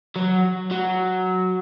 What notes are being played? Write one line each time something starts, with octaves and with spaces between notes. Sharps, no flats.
F#3
F#3